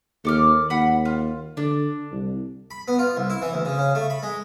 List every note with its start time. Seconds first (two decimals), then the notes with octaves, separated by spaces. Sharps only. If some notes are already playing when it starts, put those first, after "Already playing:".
0.25 D#2 A4 D6 F6
0.70 D#2 F#5 B5
1.05 F4
1.57 D3 D4
2.12 C2
2.71 B5
2.88 B3
2.99 F4
3.17 C2
3.30 E4
3.42 E3
3.53 D2
3.65 C#3
3.78 C#3
3.95 A3
4.10 B5
4.23 G#3